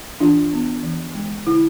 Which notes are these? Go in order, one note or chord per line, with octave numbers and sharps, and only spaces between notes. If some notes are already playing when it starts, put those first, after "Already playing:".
E3 D4 F4
B3
E3
G#3
D3 E4